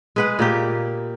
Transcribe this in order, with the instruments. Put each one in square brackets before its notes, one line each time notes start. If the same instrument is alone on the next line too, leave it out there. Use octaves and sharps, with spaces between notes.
[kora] G#3 B4 F#5
A#2 A#3 G4